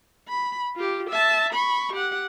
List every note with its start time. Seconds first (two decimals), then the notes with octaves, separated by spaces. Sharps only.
0.28 B5
0.76 F4 G4
1.10 E5 A5
1.53 B5 C#6
1.93 G4 F#5